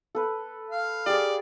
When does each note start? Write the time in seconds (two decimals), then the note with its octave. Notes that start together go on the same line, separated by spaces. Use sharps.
0.15 A4 B4
0.71 F5
1.06 G4 G#4 D5